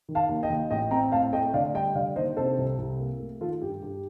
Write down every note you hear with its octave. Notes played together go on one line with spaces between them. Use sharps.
D#3
F5 A5
D#2
D#5 G5
D#2
A1 D#5 G5
C4 G5 A#5
A2 F5 A5
A3 D#5 G5
D3 D5 F5
G3 D#5 G5
D3 D5 F5
D#2 C5 D#5
C3 A4 C5
C2
C2
A#3
A3
D#3 F4 A4
G2 G4
G2 G4